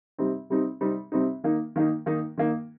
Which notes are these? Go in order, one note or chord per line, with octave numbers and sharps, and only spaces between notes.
C3 G3 C4 D#4
C3 G3 C4 D#4
C3 G3 C4 D#4
C3 G3 C4 D#4
D#3 A#3 D#4
D#3 A#3 D#4
D#3 A#3 D#4
D#3 A#3 D#4